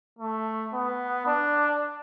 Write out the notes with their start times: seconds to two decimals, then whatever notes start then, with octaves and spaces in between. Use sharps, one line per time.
0.19 A3
0.73 B3
1.26 D4